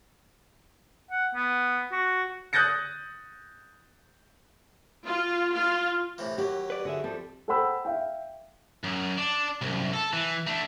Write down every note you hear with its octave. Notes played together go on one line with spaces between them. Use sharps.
F#5
B3
F#4
D#6 F#6 G6 A6 A#6 C#7
F4
F4
A2 C3 E3
D#2 F#3 G4
B4 D5
D3 F#4 G#4 E5
F3 G3 C4 A4
A4 C5 F#5 G5 B5 E6
E5 F5 G5
F#2
D4
C2 F#2
A4
E3
A3 D4